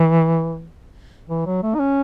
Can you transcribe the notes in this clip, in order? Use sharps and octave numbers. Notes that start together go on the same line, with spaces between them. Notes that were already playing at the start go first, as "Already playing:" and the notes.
Already playing: E3
E3
F#3
A3
D#4
C#4